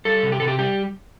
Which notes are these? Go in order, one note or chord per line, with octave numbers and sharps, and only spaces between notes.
G3 A4
C3
G4
C3 A4
G4
G3 G4